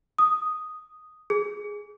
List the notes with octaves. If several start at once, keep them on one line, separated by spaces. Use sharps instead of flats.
D#6
G#4